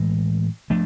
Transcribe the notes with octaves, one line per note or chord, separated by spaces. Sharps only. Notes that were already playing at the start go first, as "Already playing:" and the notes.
Already playing: A2 E3 G#3
F3 A3 D4